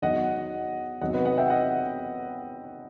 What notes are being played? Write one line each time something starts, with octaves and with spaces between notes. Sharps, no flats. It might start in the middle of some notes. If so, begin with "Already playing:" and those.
E2 D#3 F#3 D#5 F#5
E2 C3 D#3 F#3 D#5 F#5
B4 D#5
D#5 F#5
E5 G5
D#5 F#5